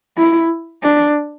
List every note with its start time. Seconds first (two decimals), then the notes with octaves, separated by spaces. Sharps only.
0.17 E4
0.83 D4